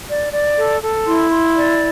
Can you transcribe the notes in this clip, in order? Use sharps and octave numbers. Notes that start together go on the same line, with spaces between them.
D5
D5
A4
A4
E4 C6
C6
D5